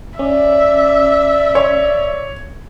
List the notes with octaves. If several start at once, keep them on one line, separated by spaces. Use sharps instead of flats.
C#4 D5 E5
C#5